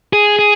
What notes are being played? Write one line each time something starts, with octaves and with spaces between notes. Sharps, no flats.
G#4
G#4